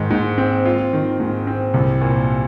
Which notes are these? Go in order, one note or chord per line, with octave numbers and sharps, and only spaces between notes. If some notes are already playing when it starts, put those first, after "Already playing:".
Already playing: G#2 D#3
G#2
C4
F4
D#3
G#2
C4
C2
A#2